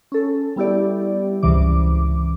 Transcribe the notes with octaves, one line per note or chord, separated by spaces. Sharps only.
C#4 A4
G3 B3 E4 G4 D5
C#2 G#2 C3 E3 D6